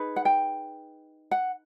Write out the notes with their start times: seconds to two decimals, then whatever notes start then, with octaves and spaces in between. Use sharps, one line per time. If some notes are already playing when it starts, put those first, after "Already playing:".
Already playing: D#4 G#4 B4
0.16 F#5
0.25 G5
1.31 F#5